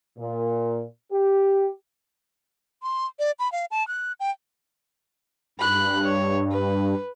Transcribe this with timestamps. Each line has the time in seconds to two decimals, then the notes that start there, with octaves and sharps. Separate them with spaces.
0.18 A#2
1.12 G4
2.83 C6
3.19 D5
3.39 B5
3.52 F5
3.71 A5
3.88 F#6
4.20 G5
5.59 G2 B5 F#6
6.04 C#5
6.52 B4